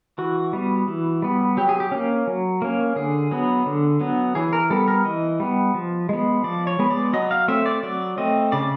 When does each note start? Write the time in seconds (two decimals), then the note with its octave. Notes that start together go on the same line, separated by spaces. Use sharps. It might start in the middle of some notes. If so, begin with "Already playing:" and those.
0.18 E3 F#4
0.53 G3 B3
0.88 E3
1.22 G3 B3
1.57 F#3 G4
1.69 G#4
1.80 G4
1.92 A#3 C#4
2.27 F#3
2.62 A#3 C#4
2.96 D3 G#4
3.31 F#3 B3
3.66 D3
4.01 F#3 B3
4.35 E3 G#4
4.53 A#4
4.70 G3 B3 A4
4.88 A#4
5.05 E3 D#5
5.40 G3 B3
5.74 F3
6.09 G#3 B3
6.44 F3 D5
6.67 C#5
6.79 G#3 B3
6.90 D5
7.13 F#3 D#5
7.31 F5
7.48 A3 C4 E5
7.66 D5
7.83 F#3 D5
8.18 A3 C4 D#5
8.52 C#3 D5